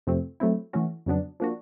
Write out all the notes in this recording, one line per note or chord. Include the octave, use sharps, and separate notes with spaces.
F2 C3 F3 A3 C4
F#3 A3 C4 E4
E3 A3 C#4 F#4
F2 C#3 F#3 B3 D4
F3 A#3 D4 F#4